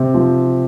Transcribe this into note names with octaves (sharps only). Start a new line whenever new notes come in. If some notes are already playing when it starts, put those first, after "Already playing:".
Already playing: C3 C4
F3